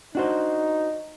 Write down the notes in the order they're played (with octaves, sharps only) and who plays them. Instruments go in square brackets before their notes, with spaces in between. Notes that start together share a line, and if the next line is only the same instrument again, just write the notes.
[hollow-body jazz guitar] D4 F#4 C5 [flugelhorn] D#4